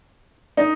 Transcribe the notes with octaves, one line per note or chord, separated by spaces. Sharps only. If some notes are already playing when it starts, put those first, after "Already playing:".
D#4